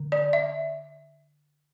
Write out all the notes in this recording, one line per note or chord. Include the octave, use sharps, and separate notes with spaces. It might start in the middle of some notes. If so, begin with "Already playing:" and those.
Already playing: D3
D5
E5